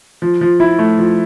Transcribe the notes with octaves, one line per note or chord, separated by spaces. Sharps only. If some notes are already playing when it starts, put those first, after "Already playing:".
F3
F3
E4
A3
F3